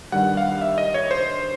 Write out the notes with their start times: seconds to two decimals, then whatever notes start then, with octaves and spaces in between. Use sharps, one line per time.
0.12 G2 D#3 G3 F#5
0.37 F5
0.61 E5
0.78 D#5
0.94 C#5
1.11 C5